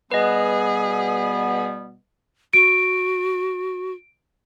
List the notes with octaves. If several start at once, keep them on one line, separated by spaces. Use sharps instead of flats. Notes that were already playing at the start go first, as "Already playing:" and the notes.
B2 G3 B3 G#4 B4 D#5
F#4 D7